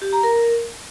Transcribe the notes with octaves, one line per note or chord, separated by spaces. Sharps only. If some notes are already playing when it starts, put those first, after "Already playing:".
G4
A#5
A#4